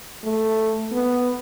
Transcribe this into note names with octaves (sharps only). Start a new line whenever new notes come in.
A3
B3